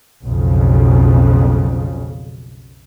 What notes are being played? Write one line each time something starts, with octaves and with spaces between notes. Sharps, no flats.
B1 F2 C#3